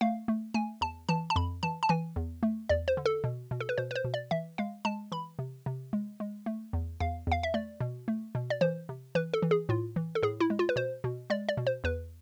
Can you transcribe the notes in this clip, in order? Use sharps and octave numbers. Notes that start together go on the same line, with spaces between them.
A3 F5
A3
A3 G#5
E2 A5
E3 A5
A5
F2 B5
E3 A5
A5
E3 G#5
E2
A3
E2 D5
C5
D3
A4
B2
B2
A4
B4
B2 C5
B4
C5
B2
D5
E3 E5
G#3 F5
G#3 A5
E3 B5
C3
C3
G#3
G#3
A3
E2
E2 F5
E2 F5
E5
A3 D5
B2
A3
B2
D5
E3 C5
C3
E3 B4
A4
E3
G#4
A2 F4
E3
A4
A2 G#4
E4
G#3
F4
B4
B2 C5
B2
G#3 D5
D5
B2
C5
E2 B4